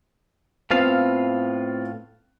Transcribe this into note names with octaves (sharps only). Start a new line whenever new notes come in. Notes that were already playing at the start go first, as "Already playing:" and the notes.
A2 B3 C4 F4 B4 F5